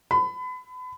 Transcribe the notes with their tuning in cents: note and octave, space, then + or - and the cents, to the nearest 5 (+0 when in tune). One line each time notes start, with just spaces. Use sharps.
B5 +30